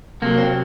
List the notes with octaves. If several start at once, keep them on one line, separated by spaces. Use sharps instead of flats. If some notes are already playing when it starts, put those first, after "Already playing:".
C3 F#3 A#3
C4